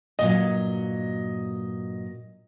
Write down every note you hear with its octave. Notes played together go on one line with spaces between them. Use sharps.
G2 A#2 F#3 D#5